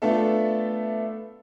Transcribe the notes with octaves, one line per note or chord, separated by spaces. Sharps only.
A3 B3 D4 F4 A4 E5